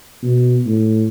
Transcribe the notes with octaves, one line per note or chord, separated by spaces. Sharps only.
B2
A2